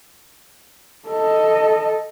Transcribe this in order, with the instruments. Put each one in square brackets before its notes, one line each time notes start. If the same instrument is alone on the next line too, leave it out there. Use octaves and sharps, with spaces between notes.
[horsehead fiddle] A4 D#5